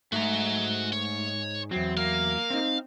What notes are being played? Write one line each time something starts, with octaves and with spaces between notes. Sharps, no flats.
G#2 A3 F#4 A#5
C#5
E2 F#3 C4
A#3 F5
C4 D#4